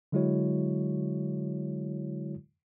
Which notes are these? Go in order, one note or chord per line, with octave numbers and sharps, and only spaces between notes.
D3 F#3 G#3 E4 F#4 C#5